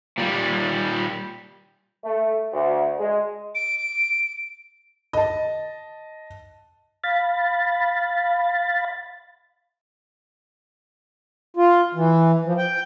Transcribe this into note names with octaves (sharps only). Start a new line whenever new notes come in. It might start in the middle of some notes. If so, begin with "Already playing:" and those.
A#2 G3
A3
D2
G#3
D7
D#5 A5
F5 B5 A6
F4
E3
F3
G5